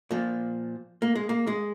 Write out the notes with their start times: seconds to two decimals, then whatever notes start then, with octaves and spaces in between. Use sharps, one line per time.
0.11 A#2 F3
1.02 A#3
1.15 G#3
1.29 A#3
1.47 G#3